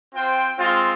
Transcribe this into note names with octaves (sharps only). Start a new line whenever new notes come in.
C4 F4 C5 G5
G#3 C4 F4